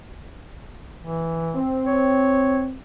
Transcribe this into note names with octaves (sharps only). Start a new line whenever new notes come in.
E3
C4
C#5